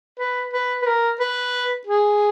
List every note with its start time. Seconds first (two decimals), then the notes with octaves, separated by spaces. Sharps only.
0.19 B4
0.53 B4
0.82 B4
0.87 A#4
1.20 B4
1.87 G#4